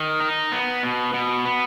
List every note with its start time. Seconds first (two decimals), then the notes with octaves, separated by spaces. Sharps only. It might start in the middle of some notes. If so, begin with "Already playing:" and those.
Already playing: D#3
0.20 D#4
0.52 B3
0.83 B2
1.14 B2
1.45 B3